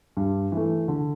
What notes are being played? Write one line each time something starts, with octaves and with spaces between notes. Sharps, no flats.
G2
E3 A3
D3